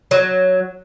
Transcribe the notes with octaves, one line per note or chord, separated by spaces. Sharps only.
F#3